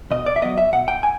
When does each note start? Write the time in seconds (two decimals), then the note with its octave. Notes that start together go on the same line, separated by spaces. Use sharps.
0.11 B2 D#5
0.26 D5
0.36 E5
0.42 F#3 B3 D#5
0.58 E5
0.73 B2 F#5
0.88 G5
1.03 G#5